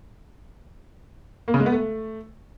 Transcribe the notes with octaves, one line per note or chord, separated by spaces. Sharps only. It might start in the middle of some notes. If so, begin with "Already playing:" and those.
A#3
C#3
G#3
B3
A3